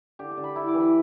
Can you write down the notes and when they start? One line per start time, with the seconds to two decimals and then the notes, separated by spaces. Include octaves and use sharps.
0.19 D3 G4
0.31 G5
0.37 D3
0.44 B5
0.56 E4 B5
0.68 D6
0.74 E3
0.80 B5